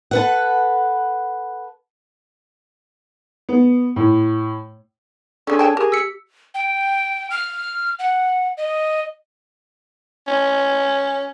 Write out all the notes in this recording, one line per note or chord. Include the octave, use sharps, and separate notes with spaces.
A4 B4 F#5
B3
A2
G#3 C#4 D4 G#4 A4
C#5 G5 A5
G4 G#4 A#4
E6 B6 C#7
G5
F6
F#5
D#5
C#4